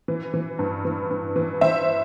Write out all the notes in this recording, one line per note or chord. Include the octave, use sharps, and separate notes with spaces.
E3
E3
G2
E3
G2
E3
E3 C5 E5